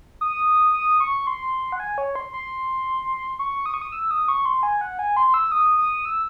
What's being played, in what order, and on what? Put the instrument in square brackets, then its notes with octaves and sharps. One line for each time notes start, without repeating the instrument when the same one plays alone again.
[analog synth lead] D#6
D#6
C#6
C6
F#5
G#5
C#5
C6
C6
C#6
D#6
C#6
D#6
E6
D#6
C#6
C6
G#5
F#5
G#5
C6
E6
D#6
D#6
E6